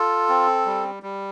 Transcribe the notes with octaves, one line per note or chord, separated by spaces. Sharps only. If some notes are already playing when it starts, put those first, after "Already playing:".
Already playing: F4 A4
C4
G3
G3